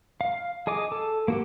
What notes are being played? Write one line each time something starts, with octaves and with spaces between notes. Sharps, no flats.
F5
G#4 D#5 G#5 D6
A4
A#3 F#4 G4